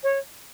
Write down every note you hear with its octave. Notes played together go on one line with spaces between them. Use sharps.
C#5